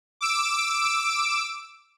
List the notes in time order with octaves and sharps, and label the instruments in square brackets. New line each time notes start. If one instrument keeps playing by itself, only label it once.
[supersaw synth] D6 E6 D7